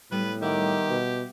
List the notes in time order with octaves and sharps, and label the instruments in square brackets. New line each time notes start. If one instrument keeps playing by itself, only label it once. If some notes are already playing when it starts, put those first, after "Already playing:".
[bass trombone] A2 [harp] G3 B3 [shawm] B4
[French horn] D#3 [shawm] G4 [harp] E5 F#5 D6
[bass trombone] B2